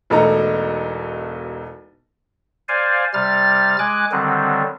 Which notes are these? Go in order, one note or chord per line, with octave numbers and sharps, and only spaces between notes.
E1 B1 A3 D#4 A4 A#5
C5 D5 F5 G#5
C3 G3 F6 A6
G#3 G#5 D6 F#6
D3 D#3 F#3 G3 C4